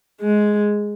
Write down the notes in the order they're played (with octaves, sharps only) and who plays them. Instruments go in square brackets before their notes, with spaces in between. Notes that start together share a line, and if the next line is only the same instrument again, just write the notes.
[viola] G#3